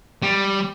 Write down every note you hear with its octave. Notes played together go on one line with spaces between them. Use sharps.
G3